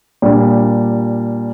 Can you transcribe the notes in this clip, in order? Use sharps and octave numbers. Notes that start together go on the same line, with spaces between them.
A#2 G3 D4